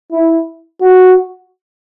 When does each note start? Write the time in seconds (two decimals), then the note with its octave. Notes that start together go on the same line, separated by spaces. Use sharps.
0.11 E4
0.81 F#4